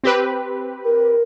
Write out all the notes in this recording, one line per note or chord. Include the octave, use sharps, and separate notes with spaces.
C4 G4 B4
A#4